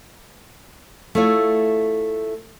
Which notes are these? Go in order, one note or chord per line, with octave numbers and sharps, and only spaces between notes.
A3 E4 F4 C#5